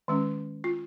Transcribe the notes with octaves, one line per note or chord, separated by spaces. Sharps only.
D#3 G#3 C#4
F4